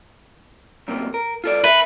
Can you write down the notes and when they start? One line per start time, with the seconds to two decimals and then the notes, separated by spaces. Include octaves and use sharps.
0.88 F#2 C3 A#3
1.14 A#4
1.44 F4 A4 D5
1.64 A#4 B4 E5